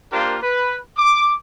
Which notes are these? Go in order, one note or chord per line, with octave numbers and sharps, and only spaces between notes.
A#3 D4 F4 G4 A#4 C5
B4
D6